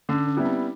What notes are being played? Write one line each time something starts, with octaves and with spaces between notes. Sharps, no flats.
D3 C#4
C#4
G3 B3 E4
C4